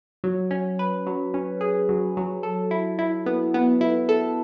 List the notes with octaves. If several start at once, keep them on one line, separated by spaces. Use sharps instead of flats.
F#3
C#4
B4
F#3
C#4
G#4
F#3
F#3
A4
E4
E4
B3
B3
E4
A4